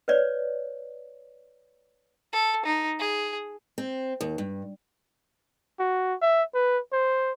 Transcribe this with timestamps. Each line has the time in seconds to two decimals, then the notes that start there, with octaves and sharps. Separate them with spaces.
0.08 B4 C#5 D5
2.33 A4
2.65 D#4
2.99 G#4
3.78 C4
4.21 D#2
4.38 G2
5.79 F#4
6.21 E5
6.54 B4
6.92 C5